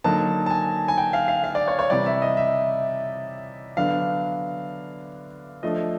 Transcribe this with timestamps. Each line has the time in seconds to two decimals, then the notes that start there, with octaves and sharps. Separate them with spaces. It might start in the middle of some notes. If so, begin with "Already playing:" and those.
0.04 D3 F#3 A#3 D#4 A5
0.46 A5
0.50 G#5
0.88 G#5
0.97 G5
1.13 F5
1.28 F5
1.44 F5
1.55 D5
1.68 C#5
1.79 C#5
1.90 C3 E3 G3 D5
2.06 E5
2.22 D#5
2.37 E5
3.77 D3 F#3 B3 D4 F5
5.63 F3 A3 D4 D#5